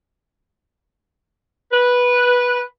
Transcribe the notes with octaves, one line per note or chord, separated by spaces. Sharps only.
B4